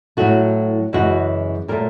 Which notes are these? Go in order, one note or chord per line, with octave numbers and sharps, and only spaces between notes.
A2 F#3 A3 F#4
F#2 C#3 E3 G#3 F#4
A#2 F#3 A3 A#4